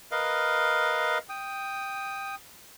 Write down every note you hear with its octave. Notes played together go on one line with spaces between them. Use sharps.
A#4 B4 D#5 F5
G5 D#6